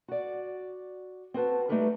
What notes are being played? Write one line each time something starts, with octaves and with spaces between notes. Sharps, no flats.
F#4 D5
C4 F#4 B4 A5
G3 A3 D#4 G4 A#4 B4